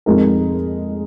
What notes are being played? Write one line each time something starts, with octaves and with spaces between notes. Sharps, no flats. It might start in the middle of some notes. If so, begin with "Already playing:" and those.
F2 F3 G#3 D#4 A#4